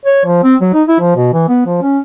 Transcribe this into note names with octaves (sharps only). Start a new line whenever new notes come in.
C#5
F3
C4
F#3
D#4
E4
F3
B2
E3
B3
F3
C#4